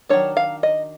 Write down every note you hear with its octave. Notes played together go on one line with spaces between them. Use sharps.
D#3 F#3 A#3 D4 C#5
F5
D#5